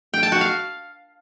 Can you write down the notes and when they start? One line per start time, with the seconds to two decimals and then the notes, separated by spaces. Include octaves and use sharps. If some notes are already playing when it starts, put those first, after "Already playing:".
0.14 G5
0.23 A5
0.32 F#4
0.41 F5